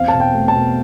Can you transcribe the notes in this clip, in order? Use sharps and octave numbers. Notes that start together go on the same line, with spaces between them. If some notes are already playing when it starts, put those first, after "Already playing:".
Already playing: E2 C4 F5
B2 A5
G5
A3
A5
B2